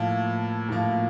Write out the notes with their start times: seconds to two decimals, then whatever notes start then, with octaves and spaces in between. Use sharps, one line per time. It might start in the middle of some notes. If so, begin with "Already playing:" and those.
Already playing: A2 F3 A#3
0.69 A2 F3 A#3